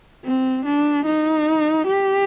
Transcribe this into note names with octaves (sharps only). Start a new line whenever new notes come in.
C4
D4
D#4
G4